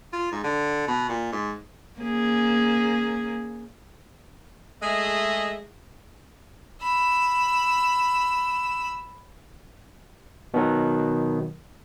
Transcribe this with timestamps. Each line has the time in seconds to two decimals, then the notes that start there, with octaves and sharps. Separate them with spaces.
0.13 F4
0.32 G#2
0.44 D3
0.88 B2
1.09 A#2
1.33 G#2
2.00 A#3 C#4 G#4
4.82 G#3 A3 G#4 D#5 E5
6.82 B5 E6
10.54 B2 D#3 F#3